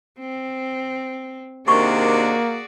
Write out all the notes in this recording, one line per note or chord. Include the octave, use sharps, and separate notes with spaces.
C4
C3 D#3 A#3 D4 F#4 G#4 D5 C#6